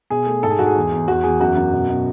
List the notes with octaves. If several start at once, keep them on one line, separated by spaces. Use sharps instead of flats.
B2 G#4
A3
G#2 A4
G#4
G#2 F#4
G#4
E2
E2
E2 F#4
E2 G#4
F#2 F#4
F#2
B2
B2